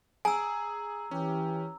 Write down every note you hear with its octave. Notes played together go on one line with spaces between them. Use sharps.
G#4 G#5 A#5 E6
E3 C#4 G4